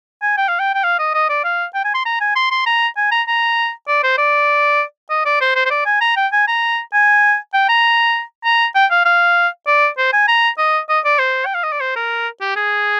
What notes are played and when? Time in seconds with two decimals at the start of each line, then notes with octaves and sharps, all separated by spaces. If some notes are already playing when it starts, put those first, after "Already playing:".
0.22 G#5
0.37 G5
0.48 F5
0.60 G5
0.74 G5
0.84 F5
0.99 D#5
1.14 D#5
1.30 D5
1.44 F5
1.75 G5
1.84 G#5
1.94 C6
2.05 A#5
2.21 G#5
2.36 C6
2.51 C6
2.66 A#5
2.97 G#5
3.12 A#5
3.28 A#5
3.88 D5
4.03 C5
4.18 D5
5.10 D#5
5.26 D5
5.41 C5
5.55 C5
5.66 C5
5.71 D5
5.86 G#5
6.01 A#5
6.16 G5
6.32 G#5
6.48 A#5
6.93 G#5
7.54 G5
7.69 A#5
8.45 A#5
8.75 G5
8.91 F5
9.06 F5
9.67 D5
9.98 C5
10.13 G#5
10.28 A#5
10.58 D#5
10.89 D#5
11.05 D5
11.19 C5
11.46 G5
11.54 F5
11.63 D#5
11.72 D5
11.81 C5
11.96 A#4
12.41 G4
12.56 G#4